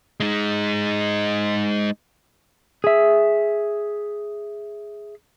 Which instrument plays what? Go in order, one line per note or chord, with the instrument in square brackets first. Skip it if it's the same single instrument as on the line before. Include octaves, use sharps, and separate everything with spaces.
[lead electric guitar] G#3 D#4
[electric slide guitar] G#4 E5